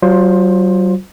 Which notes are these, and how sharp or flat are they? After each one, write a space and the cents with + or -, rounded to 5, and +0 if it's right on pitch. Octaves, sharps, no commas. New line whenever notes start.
F#3 +40 F4 +15 C5 +10